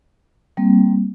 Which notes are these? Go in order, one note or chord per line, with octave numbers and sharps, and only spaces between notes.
G3 A#3 C4